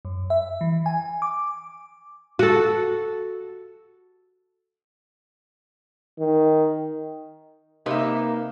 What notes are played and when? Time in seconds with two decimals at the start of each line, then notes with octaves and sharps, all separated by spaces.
0.05 F#2
0.30 E5
0.61 E3
0.86 G#5
1.22 D6
2.39 F#4 A4
6.19 D#3
7.86 C3 A#3 D#4 B4 E5